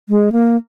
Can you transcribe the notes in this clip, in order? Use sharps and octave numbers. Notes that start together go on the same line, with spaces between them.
G#3
A#3